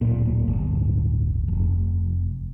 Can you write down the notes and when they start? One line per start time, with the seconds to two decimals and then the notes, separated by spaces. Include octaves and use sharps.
0.01 D1 A#2
0.48 D1 G1
1.48 F1